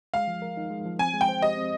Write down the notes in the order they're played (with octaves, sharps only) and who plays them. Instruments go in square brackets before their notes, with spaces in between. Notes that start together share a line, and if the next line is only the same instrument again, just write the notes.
[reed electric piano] G#3 [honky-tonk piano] F5
[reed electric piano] F3
A#4
D#4
G#3
F3
[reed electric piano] C4 [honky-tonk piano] G#5
[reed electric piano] G#3
[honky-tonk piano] G5
[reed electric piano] C5
[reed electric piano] G4 [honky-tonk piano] D#5
[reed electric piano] C4